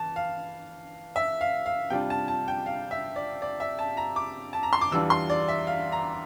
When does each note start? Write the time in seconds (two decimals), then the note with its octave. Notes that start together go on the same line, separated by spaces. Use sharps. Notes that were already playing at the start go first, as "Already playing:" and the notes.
Already playing: E3 A5
0.16 F5
1.16 E5
1.41 F5
1.66 F5
1.90 C3 G3 D4 F4 G5
2.10 A5
2.28 A5
2.48 G5
2.66 F5
2.91 E5
3.16 D5
3.42 D5
3.60 E5
3.79 A5
3.97 A#5
4.16 D6
4.53 A5
4.63 A#5
4.73 C6
4.81 D6
4.91 E2 E3 G3 D4 F4 E6
5.10 C6
5.30 D5
5.48 E5
5.67 F5
5.92 A#5